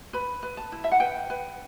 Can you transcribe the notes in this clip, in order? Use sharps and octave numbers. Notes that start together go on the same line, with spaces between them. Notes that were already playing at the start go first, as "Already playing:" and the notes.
B4 B5
B4
A5
E4
E5
F#5
B4 G5
B4